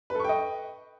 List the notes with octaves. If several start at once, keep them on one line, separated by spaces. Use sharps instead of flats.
A4 B4 D#5 G5 C#6